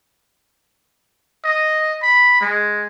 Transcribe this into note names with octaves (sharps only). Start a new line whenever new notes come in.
D#5
B5
G#3